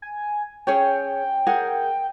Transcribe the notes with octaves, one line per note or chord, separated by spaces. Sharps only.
G#5
C#4 G#4 C#5 G5
G#4 A#4 F#5